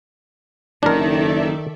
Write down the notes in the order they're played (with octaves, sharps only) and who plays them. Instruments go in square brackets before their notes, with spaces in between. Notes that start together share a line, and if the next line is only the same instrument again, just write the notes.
[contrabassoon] F#1 [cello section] D#3 [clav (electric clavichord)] D4 A#4 [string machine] A4 D5 E5